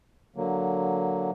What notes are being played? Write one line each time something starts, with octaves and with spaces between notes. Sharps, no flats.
D3 F#3 A#3